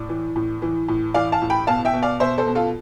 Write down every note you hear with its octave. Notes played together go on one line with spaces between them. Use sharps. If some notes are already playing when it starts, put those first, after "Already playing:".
Already playing: A2 D5
E3
A2
E3
A2
E3 D5 F5
F5 A5
A2
G5 B5
B2 F5 A5
E5 G5
B2
D5 F5
B2 C5 E5
A4 C5
B2
F4 A4